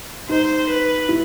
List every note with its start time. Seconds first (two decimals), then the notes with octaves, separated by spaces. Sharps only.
0.29 D#4 C5
0.69 B4
1.09 E4